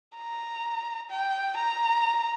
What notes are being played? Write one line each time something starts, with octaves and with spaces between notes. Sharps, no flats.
A#5
G5
A#5